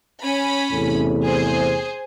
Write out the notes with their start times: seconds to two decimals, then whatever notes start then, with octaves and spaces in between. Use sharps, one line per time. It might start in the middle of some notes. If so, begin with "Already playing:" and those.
0.23 C#4 B5
0.72 E2 A2 C3
1.25 G#4 C5